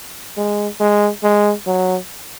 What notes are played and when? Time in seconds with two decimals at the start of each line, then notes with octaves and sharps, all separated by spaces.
0.37 G#3
0.80 G#3
1.23 G#3
1.66 F#3